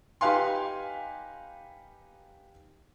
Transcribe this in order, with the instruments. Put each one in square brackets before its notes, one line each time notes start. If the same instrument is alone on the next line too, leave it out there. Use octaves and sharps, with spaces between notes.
[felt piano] D#4 G4 B4 F5 G#5 C6